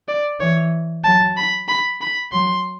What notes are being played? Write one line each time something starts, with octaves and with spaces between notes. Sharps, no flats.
D5
E3 C#5
F#3 A5
B5
B5
B5
F#3 C6